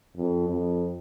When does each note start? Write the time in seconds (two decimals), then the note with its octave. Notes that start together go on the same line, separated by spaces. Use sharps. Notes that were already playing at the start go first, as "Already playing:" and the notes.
0.17 F2
0.50 F2